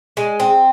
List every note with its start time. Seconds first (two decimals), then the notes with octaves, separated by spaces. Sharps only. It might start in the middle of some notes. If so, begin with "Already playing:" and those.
0.17 G#3
0.40 C4